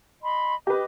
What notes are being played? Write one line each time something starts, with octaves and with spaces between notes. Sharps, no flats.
D#5 B5 C6
G4 B4 D#5 D6